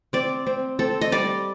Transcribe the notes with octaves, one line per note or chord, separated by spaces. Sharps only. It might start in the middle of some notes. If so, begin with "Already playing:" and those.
C4 D5
C4
C4 A4
D#5
G3 D5